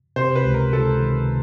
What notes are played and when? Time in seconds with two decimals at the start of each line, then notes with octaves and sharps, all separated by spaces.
0.16 C3 C5
0.35 B4
0.44 C#2
0.54 A#4
0.73 C#2 A4
1.01 D#3